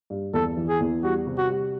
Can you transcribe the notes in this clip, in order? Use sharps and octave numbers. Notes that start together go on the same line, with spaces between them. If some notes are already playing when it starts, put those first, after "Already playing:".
G2
E2 A4
E3
G#4
E2
G3 F#4
C3
F#4
G3